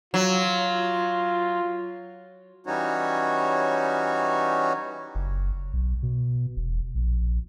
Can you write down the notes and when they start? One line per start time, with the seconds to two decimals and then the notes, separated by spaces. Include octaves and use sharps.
0.14 F#3 F4
2.67 E3 G3 C#4 D#4 F#4 C#5
5.15 F#1
5.73 B1
6.03 B2
6.56 E1
6.95 A#1